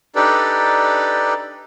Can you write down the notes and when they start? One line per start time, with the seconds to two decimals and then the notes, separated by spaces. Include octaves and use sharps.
0.16 D4 D#4 G4 A4 B4 D5